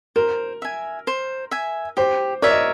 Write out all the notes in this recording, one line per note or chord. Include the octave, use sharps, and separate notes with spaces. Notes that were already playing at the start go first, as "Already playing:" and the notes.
A#4 C5
E5 G#5
C5
E5 G#5
G4 C5
A#4 C#5 D5 E5
D#5